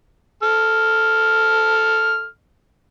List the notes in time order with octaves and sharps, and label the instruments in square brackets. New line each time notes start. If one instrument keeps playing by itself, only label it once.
[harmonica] A4 F6